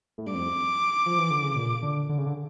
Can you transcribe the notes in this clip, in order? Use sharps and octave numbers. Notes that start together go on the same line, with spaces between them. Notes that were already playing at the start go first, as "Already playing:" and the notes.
A2
G2
F2 D6
F3
E3
D3
C#3
A#2
D3
D3
C#3
D3